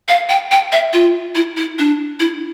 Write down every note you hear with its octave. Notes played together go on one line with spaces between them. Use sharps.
F5
G5
G5
E5
F4
E4
E4
D4
E4